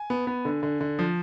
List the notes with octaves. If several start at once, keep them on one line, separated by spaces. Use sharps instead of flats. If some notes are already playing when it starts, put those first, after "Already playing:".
Already playing: G#5
B3
B3
D3
D3
D3
F3